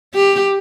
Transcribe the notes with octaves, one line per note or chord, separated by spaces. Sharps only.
G4